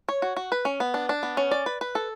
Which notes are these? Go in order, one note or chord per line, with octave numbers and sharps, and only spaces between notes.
C#5
F#4
F#4
B4
C#4
B3
D4
D4
B3
C#4
D5
B4
B4
A4